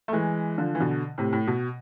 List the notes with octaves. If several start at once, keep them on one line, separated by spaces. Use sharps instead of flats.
A3
E3 G#3
D3 F3
E3
B2 D3
A2 C3
A2
B2